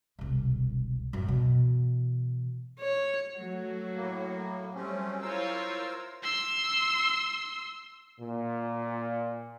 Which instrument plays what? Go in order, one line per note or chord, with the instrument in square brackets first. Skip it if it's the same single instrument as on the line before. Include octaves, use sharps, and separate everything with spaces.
[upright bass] E1 C2
F#2 A2
B2 E3
[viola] C#5
[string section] F#3 A3 F#4
[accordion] A2 A#3
[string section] F#3 G3 [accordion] A3 C4 C#4
[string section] E4 F4 C#5 [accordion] A#4 C5 E6
[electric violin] C6 E6
[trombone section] A#2